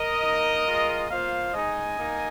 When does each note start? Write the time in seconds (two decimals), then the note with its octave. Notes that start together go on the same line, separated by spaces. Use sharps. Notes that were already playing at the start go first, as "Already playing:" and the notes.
Already playing: A#4 D#5
0.23 A#3 D#4
0.67 G#3 F4
1.09 A#3 F4 C5 F5
1.52 G#3 D#4 D#5 G#5
1.96 A#3 D#4